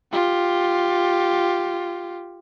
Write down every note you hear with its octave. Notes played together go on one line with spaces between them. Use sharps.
F4 G4